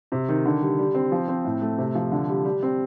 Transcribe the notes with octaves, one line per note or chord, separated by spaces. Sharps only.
C3
D#3
D3
G3
G3
C4
F3
C4
A2
A3
C3
F3
D3
G3
G3
C4